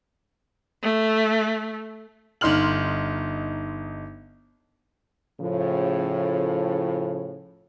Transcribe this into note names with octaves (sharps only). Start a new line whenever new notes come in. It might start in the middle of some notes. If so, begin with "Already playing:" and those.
A3
G1 D#4 C6 F6 F#7
A2 C#3 F3